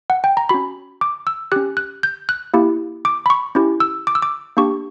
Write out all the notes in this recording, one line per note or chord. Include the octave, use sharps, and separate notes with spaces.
F#5
G5
A#5
C#4 F#4 B5
D6
E6
C#4 G4 F#6
F#6
G6
F#6
A#3 E4 G4
D6
B5
C#6
C#4 E4 G4
E6
D6
E6
D6
A#3 D4 G4 C#6